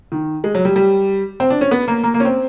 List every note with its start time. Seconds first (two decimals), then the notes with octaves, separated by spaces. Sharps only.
0.12 D#3
0.44 G#3
0.55 F#3
0.65 G3
0.76 G3
1.40 C4
1.50 D4
1.61 C#4
1.71 B3
1.88 A#3
2.04 A#3
2.14 A#3
2.20 C#4
2.25 C4